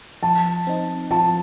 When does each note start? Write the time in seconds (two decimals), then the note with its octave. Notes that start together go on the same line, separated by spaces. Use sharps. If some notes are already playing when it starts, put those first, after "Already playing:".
0.22 F3 A5
0.67 C4 D#4
1.11 F3 A5